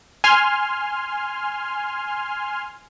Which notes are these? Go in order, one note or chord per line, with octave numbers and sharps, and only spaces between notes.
G#5 C6 F6